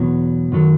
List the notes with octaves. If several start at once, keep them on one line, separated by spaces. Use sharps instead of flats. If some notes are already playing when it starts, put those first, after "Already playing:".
Already playing: E2 B2 F#3
F#2 D#3 F#3